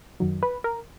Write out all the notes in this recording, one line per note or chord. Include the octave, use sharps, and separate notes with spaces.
F#2 D#3 F#3
B4
A#4